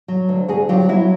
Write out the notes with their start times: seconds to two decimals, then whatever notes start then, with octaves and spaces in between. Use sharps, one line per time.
0.08 F#3
0.29 D2
0.48 D2 F#4 G#4
0.69 F#3 F4 G4
0.89 F#3 E4 F#4